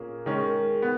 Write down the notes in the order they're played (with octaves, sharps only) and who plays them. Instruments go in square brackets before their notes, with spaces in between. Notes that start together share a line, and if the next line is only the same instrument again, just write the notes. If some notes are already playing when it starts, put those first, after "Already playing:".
Already playing: [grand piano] A#2 A#3 C#4 G#4
[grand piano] D#3 G#3 C#4 [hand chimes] A#4
[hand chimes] G#4
A#4
[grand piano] B3